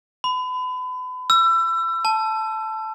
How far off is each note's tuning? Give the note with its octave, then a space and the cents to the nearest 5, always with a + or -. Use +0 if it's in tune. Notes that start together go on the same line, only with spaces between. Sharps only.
B5 +35
E6 +30
A5 -5